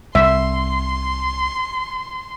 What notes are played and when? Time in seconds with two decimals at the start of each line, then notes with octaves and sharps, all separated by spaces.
0.15 C2 E5 C6